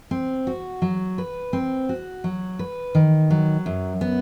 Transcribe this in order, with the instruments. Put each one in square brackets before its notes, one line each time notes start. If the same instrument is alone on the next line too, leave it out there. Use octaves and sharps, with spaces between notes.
[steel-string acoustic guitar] C4
F#4
F#3
B4
C4
F#4
F#3
B4
D#3
F#3
F#2
B3